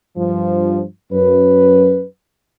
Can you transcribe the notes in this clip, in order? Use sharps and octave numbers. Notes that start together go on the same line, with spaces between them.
G2 F3
F#2 B4